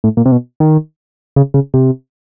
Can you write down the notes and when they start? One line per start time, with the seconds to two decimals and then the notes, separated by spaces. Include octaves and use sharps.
0.04 A2
0.17 A#2
0.26 C3
0.32 B2
0.60 D#3
1.36 C#3
1.54 C#3
1.74 C3